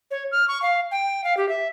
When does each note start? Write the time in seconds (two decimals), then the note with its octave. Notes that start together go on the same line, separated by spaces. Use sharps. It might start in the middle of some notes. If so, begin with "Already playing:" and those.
0.11 C#5
0.32 F6
0.48 C#6
0.62 F5
0.91 G5
1.24 F5
1.37 G4
1.49 E5